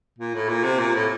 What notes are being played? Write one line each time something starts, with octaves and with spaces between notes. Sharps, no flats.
A#2
A2
A#2
C3
A#2
A2